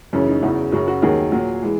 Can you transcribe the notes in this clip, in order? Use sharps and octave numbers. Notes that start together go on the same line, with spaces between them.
F#2 C#3 E3 C#4
D#4
E2 C#3 F#3 E4
F#2 C#3 F#3 F#4
F#4
D#2 D#3 F#3 G#4
A#2 F#3
E3 G#3